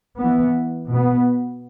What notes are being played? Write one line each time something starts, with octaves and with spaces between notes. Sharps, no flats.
B3
E3
B2 B3